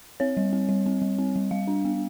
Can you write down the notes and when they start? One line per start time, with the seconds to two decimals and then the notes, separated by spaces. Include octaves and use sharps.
0.20 C4 C#5
0.37 G3
0.53 C4
0.69 G3
0.86 C4
1.02 G3
1.19 C4
1.36 G3
1.51 G3 F5
1.68 D4
1.85 B3